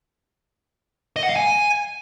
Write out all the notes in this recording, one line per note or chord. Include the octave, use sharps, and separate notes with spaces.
D#5
F#5
F5
G#5